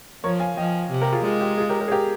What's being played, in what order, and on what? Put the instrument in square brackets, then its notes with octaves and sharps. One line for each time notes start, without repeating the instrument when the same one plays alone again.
[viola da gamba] F3 [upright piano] A#4 C#5
[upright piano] F5 G#5
[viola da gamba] F3 [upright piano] D#5 G5
[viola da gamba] C3
[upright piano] G4 A#4
F4 G#4
[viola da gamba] G#3 [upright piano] F4
[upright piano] G4
F4 G#4
G4 A#4
G4 A#4
G#4
G4 A#4